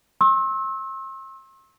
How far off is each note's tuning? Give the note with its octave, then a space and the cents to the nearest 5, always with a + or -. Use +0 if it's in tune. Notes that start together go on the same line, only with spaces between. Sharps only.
C6 +40 E6 -20